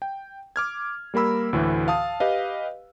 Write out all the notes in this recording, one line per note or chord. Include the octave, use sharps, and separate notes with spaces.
G5
D6 F6 G#6
G3 A#3 A#4 B5 E6
D2 A2 E3
F5 A5 D#6
G4 B4 D#5 F5